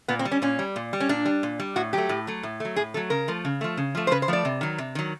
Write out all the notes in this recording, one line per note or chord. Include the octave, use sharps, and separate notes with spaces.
A#2 B3
C4
G3
C#4
A#2 C#4
G3
A#2
G3
C#4
A#2 D4
G3
A#2
G3
A2 F#4
F#3 A3 G4
A2
F#3 A3
A2
F#3 A3
A2 G#4
F#3 A3 A4
C#3 A#4
F3 A3
C#3
F3 A3
C#3
F3 A3
C5
C#3 B4
C5
F3 A3 D5
C3
D#3 F#3
C3
D#3 F#3